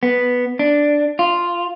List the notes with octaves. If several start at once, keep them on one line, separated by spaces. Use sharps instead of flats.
B3
D4
F4